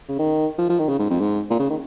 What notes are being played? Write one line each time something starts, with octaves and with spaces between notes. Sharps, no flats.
C#3
D#3
F3
F3
D#3
C#3
G#2
F2
G#2
A#2
C#3
D#3